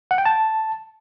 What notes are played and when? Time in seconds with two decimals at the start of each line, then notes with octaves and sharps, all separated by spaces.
0.11 F#5
0.18 G5
0.26 A5